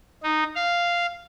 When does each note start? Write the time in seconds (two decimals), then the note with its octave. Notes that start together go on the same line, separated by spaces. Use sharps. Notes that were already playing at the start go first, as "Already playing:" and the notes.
0.23 D#4
0.55 F5